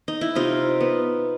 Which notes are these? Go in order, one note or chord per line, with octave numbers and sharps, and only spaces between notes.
D#4
E4
C3 D#4 F4
B3